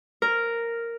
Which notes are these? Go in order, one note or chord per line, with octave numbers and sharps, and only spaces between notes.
A#4